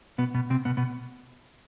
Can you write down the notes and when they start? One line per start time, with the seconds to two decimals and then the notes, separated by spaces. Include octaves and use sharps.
0.18 B2 B3
0.34 B2 B3
0.50 C3 C4
0.65 B2 B3
0.77 B2 B3